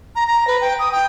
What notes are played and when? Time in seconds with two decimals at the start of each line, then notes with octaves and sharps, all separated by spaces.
0.15 A#5
0.27 A#5
0.47 B4
0.61 G5
0.79 D#6
0.92 G5